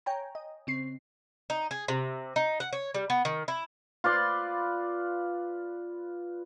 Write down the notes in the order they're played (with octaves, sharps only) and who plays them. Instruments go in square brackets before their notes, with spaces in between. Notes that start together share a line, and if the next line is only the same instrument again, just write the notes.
[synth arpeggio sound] C#5 G5 G#5 A#5
D#5
C#3 C4 C7
[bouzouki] D#4
G#4
C3
D#4
F#5
C#5
G3
B3
D#3
E4
[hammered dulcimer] F4 B4 D5 C6